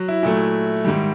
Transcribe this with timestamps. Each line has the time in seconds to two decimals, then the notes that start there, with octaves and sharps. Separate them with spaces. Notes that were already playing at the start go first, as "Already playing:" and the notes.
Already playing: F#3
0.08 E4
0.23 A#2 F#3 A3 E4
0.84 G#2 D#3 G3